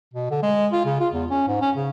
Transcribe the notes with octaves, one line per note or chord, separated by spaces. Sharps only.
B2
D3
G#3
F4
C#3
F4
E2
C#4
G#2
C#4
C#3